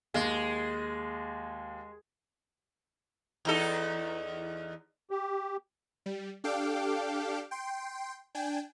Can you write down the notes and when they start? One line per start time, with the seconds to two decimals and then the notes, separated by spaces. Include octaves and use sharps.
0.14 D#2 G#3
3.45 E2 D#4 A4
5.11 G4
6.06 G3
6.44 D4 G4 A4 F5 G5 D6
7.51 G5 C6
8.35 D4 G5 G#5